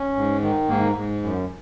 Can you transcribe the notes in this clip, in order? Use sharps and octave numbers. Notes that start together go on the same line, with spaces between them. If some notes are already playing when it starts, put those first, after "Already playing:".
Already playing: C#4
G#2
D#3
G#2 A#3
G#2
F#2